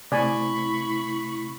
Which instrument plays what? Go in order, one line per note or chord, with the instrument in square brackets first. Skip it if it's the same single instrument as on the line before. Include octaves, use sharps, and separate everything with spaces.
[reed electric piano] C3 A3 C4 [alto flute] E4 [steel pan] D5 G#5 [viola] B5 C#6